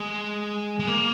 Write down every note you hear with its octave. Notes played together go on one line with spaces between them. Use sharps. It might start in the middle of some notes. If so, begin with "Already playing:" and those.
Already playing: G#3
G#3
A#3